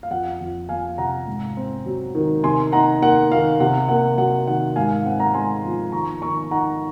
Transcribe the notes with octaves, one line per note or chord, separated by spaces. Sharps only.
F5
F2 F#5
F2
F3 F5 G#5
C3 F#5 A#5
G#2
C4
F#3
D#3
C3 G#5 C6
D#4 F#5 A#5
A#3 F#5
D#3 F5
C3 F#5
A#3 F#5
F#3 F#5
D#3 F#5
G#2 F5 G#5
F5
C4 F#5
F#5 A#5
G#3 G#5 C6
F3
D#3 A#5 C#6
D#3 A#5 C#6
D#4 F#5 A#5